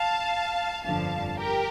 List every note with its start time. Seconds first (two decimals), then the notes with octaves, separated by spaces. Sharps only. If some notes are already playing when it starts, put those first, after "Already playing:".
Already playing: F5 A5
0.84 G1 F2 D3 F3 F5 A5
1.38 G4 A#4